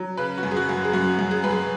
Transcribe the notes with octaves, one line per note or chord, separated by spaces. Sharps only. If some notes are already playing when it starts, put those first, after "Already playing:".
Already playing: F#3
C#3 B4
F#4
F#2
G#4
F#4
F#2
G#4
F#2 F#4
F#2
G#4
F#2 B4
G#4